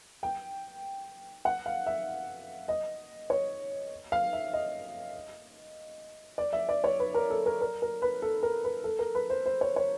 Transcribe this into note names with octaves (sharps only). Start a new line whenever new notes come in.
G5
F#5
F5
E5
D#5
C#5
F5
E5
D#5
D5
E5
D5
C#5
B4
A#4
A4
A#4
A#4
A#4
B4
A4
A#4
B4
A4
A#4
B4
C5
C5
C#5
C#5